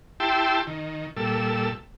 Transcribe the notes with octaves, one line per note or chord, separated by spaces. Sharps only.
E4 G4 G5 A5 C6 E6
D#3
A#2 G3 A4 E6